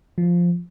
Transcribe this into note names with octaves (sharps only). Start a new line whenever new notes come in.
F3